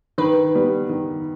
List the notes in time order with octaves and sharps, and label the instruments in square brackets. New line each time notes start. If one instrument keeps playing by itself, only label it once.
[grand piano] D#3 [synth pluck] B4
[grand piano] G3 B3
D#3